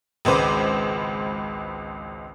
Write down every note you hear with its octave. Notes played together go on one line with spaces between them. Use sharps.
G#1 C#2 B4 C5 D6